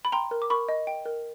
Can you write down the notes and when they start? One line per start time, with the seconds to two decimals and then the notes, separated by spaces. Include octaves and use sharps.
0.05 B5
0.12 G5 A#5 C6
0.31 A#4
0.42 D6
0.50 A#4 B5 C#6
0.68 D#5
0.87 G5
1.05 A#4